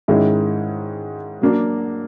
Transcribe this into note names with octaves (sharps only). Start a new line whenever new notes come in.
G#2 D#3 G#3 C#4 E4
F#3 A#3 D4